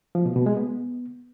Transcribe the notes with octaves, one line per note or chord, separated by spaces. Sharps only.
F3
B2
B2
G#3
B3